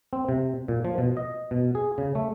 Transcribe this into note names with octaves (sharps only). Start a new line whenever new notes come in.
C4
C3
A#2
F3
B2
D#5
B2
G#4
C#3
A3